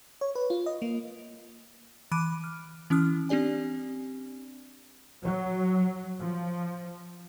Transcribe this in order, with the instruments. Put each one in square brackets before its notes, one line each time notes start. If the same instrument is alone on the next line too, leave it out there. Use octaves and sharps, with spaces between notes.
[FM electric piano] C#5
B4
F4
D#5
A#3
[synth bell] E3 B5 D6 F#6 D7 D#7
F6
E3 C#4 E4 D#6 F6
C4 D4 G4 D5 G#5
[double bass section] F#3
F3